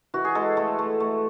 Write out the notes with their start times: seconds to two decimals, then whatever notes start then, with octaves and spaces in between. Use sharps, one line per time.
0.14 E3 F#4
0.25 G#4
0.35 G#3 A4
0.57 A3 A4
0.79 A3
1.00 A3